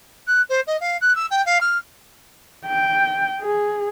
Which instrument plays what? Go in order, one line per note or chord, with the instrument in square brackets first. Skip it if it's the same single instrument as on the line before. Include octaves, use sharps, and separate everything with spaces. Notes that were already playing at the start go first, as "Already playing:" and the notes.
[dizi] F#6
C5
D#5
F5
F#6
E6
G5
F5
F6
[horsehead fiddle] G5
G#4